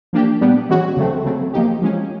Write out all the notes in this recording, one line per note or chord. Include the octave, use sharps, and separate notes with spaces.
F3 A#3 D4 G4
A#2 G3 B3 D4 G4
E3 G#3 C#4 F#4
C#3 F#3 A3 C4
C#3 F#3 A3 C4
F3 A#3 D#4 G4
F3 G#3 C#4